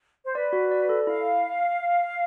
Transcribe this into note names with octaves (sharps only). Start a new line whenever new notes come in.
C5
B4 D5
F#4
D5
A4
E4 F5